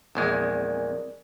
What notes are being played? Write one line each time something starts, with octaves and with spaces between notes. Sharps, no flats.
A#1 E2 G#3 C4 A#4 D5